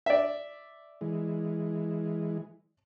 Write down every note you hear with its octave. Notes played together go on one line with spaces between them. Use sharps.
D5 E5
E3 G#3